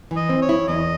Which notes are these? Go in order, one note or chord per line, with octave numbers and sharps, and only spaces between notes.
E3
D#5
C4
C#5
E4
E2 D#5